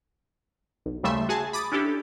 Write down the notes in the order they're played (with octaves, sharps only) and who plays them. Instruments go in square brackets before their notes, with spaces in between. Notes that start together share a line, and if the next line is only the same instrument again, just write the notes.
[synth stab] B1
D#2 C#3 G3 A3 E5 C6
F#4 G#4 G#5 A5
B5 D6 D#6 A6
C#4 D4 E4 G4 A4